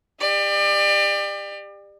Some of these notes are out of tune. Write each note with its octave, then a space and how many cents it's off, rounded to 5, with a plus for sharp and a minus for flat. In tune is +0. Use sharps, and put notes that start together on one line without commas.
G4 +30 D5 +30